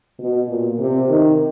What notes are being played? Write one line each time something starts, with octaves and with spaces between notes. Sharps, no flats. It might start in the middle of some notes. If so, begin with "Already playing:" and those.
B2
A#2
C3
D#3